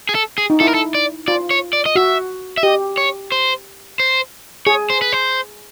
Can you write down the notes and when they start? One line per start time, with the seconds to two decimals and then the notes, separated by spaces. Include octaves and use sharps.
0.09 G#4
0.15 A4
0.38 G#4
0.50 D#4
0.60 E4 A4
0.67 A#4
0.74 A4
0.95 D5
1.28 F4 D5
1.51 C#5
1.73 D5
1.86 D#5
1.95 F#4 E5
2.58 E5
2.63 G4 D#5
2.98 C#5
3.32 C5
4.00 C5
4.67 G#4 C#5
4.90 C5
5.02 B4
5.12 C5